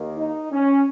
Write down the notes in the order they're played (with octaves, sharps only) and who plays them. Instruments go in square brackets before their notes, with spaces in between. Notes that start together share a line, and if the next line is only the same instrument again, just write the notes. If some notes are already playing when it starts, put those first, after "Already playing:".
Already playing: [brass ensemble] D#2 D#3 A#3
D#4
C#4